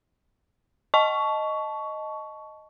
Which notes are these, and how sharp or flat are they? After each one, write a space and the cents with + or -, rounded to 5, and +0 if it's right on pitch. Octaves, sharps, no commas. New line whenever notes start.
D#5 +0 A5 -15 C#6 +15